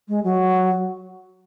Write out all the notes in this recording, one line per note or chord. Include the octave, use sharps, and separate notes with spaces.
G#3
F#3